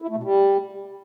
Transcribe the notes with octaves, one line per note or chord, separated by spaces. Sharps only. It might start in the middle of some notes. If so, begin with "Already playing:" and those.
E4
A3
B2
G3